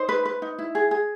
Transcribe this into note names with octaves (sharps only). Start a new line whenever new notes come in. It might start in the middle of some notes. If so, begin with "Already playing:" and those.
Already playing: D#4 C5
B4
B4
D#4
E4
G#4
G#4